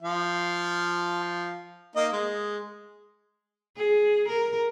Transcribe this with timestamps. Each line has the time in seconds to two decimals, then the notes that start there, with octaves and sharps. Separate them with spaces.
0.02 F3 F5
1.96 A#3 D#4 D#5
2.13 G#3
3.77 G#4
4.28 A#4